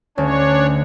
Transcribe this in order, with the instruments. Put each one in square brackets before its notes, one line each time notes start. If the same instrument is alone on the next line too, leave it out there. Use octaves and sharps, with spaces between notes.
[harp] D2 [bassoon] C#4 [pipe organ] D4 C#5